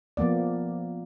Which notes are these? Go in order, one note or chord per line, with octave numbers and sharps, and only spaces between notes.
F3 A#3 B3 D5